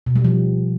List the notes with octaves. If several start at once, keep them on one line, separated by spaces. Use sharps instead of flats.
B2
G3
F3